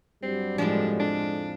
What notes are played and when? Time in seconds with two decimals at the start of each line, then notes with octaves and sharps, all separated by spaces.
0.23 G2 F#3 G3 C4
0.58 F2 A2 F3 G#3 D4
1.00 D4